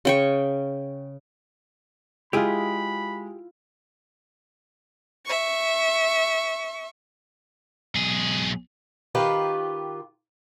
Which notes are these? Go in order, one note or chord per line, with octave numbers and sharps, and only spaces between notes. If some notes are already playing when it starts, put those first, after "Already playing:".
C#3 G5 C#6
G#3 E4 F4 G4 G#4 B5
E5 C#6
B1 G#4
D#3 F4 G4 B4